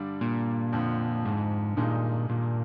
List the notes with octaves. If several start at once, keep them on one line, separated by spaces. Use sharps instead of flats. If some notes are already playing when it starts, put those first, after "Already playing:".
Already playing: G2 D3 G3 D4
A#2
F2 D3 F3
G#2
G2 A#2 D#3 G#3 D#4
A#2